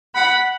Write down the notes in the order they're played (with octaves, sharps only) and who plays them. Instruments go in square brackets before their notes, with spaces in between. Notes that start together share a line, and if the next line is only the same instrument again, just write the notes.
[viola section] F#5 B5